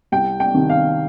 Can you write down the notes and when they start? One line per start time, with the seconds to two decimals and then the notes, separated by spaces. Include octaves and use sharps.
0.12 C2 G5
0.40 G5
0.54 C3 D#3
0.70 F5